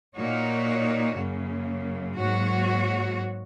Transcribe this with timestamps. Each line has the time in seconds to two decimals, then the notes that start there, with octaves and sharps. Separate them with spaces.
0.15 A#2 A#3 D#4 F#4 C#5
1.17 F#2 C#3 A#3
2.18 G#2 F#3 A#3 F#4 C#5